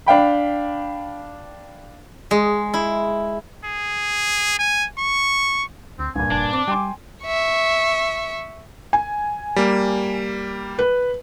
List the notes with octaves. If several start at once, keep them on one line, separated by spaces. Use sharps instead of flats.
D4 F5 G5 B5
G#3
E4
G#4
G#5
C#6
D2 C4
C#2 G2 A#2 G#5
F1 D4
C4 D6
G3 G5 G#5 C6
E5 C#6
G#5
G3 A#3
B4